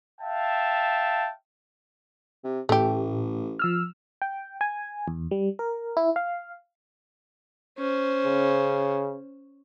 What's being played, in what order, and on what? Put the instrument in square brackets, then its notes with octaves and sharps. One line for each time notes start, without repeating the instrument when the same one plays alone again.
[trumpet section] E5 F5 G5 A5
[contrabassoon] C3
[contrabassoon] A1 [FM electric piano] A2 [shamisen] A3 G4
[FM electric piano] F3 E6 F6
G5
G#5
E2
G3
A#4
E4
F5
[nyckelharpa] C#4 C5
[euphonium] C#3